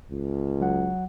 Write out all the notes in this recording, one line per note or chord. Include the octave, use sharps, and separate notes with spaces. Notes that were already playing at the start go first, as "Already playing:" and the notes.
C#2
F#3 F#5